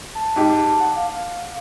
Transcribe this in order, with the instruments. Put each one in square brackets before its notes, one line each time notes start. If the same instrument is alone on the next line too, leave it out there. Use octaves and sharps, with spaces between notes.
[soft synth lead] A5
[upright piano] G#2 G4 D6
F#5
[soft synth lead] F5